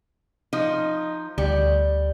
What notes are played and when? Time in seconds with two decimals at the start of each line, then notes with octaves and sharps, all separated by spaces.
0.53 F3 D#4
1.38 D2 G3